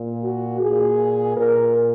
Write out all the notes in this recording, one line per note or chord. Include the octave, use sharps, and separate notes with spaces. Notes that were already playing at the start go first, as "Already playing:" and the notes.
Already playing: A#2
F#4
A#2 G#4
A#2 A#4